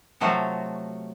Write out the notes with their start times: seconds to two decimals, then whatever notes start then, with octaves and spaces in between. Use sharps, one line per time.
0.20 C3 F3 F#3 A3 F4 F#4